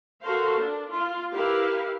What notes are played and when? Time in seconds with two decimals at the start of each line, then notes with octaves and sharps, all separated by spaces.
0.21 F#4 A4 A#4 C5 F5
0.58 D4
0.90 F4
1.33 E4 G4 A#4 B4 F5